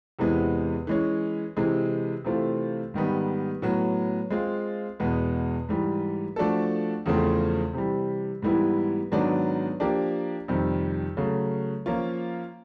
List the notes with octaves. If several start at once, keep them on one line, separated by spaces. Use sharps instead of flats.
E2 C3 E3 G#3 B3
E3 G#3 C#4
C3 E3 G#3
C3 E3 A3 C4 F4
G#2 D#3 G3 B3
A2 F#3 B3
G#3 C4 F4
E2 B2 G#3 B3
G#2 E3 G3
F3 A3 D4 F#4 A4
E2 C#3 F3 A3 C4
C3 E3 G3
G#2 E3 G3 B3 E4
G#2 D#3 F#3 B3 D4
F3 A#3 D4 G4
F2 C3 D#3 G3
C#3 F#3 A3
F3 A#3 C#4 F4